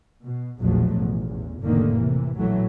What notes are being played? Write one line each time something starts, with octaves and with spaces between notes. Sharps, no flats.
B2
A#1 E2 B2 F3 F#3 A3
A1 E2
F1 A2 D3 D#3 A#3
C3 E3
A#1 A2 E3 F#3 A3